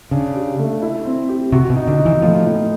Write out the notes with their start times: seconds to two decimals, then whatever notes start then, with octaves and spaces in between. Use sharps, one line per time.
0.11 C#3 D4
0.35 G4
0.59 A3
0.82 E4
1.05 C4
1.29 G4
1.52 C3 F#4
1.70 B2
1.76 D#4
1.87 D3
1.99 D#4
2.05 E3
2.22 A2 F3
2.46 A2